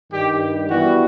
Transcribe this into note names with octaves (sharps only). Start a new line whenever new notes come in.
G2 D#3 G3 G4
E3 G3 B3 E4 F#4